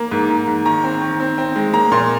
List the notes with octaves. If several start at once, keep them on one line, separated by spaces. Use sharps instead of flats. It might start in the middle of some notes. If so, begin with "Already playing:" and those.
Already playing: A#3
G#2
G#2
G#2
D#3 A#5
C4
D#3
C4
C4
G#3
A#3 A#5
A#2 C6